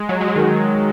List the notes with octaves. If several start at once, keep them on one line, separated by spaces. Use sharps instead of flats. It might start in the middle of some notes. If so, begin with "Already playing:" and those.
Already playing: G#3
F#3
G#3
F#3
D#3